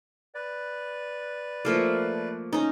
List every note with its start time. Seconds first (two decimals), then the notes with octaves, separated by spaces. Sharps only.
0.35 B4 D5
1.65 F3 A3 A#3
2.53 C#4 D#4